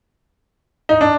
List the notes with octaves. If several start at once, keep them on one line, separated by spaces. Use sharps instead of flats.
D#4
D4